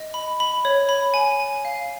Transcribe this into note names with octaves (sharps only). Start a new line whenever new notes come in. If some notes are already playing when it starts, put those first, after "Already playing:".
Already playing: D#5
B5
B5
C#5
B5
G#5
G#5
F5